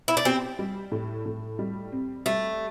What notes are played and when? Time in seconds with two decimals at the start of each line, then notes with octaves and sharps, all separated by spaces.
0.08 E4
0.17 D4
0.25 C4 G4
0.59 G3
0.92 A2
1.26 A2
1.59 G3
1.92 C4
2.26 G3 A3